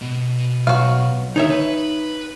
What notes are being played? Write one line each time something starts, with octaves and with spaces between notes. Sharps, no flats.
B2
B1 F#4 F5
D#2 D3 D#4 C#5 E5
B4